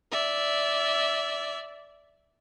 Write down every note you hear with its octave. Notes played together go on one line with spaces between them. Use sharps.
D5 E5